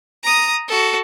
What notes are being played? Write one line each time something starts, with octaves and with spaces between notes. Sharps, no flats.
A#5 D#6
F#4 A4